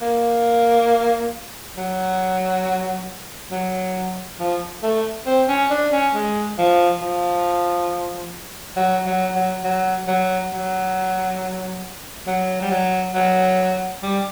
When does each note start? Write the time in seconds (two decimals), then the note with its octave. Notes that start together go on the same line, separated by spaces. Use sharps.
0.02 A#3
1.77 F#3
3.51 F#3
4.40 F3
4.83 A3
5.26 C4
5.49 C#4
5.70 D4
5.92 C#4
6.14 G#3
6.58 F3
7.02 F3
8.77 F#3
9.06 F#3
9.35 F#3
9.64 F#3
10.08 F#3
10.52 F#3
12.27 F#3
12.61 G3
12.71 F#3
13.15 F#3
14.02 G3